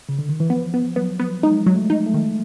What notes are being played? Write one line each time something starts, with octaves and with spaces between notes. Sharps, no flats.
C#3
D3
D#3
E3
F3 B3
B3
F#3 B3
B3
G#3 D#4
F#3
A3
D#4
A3
D#3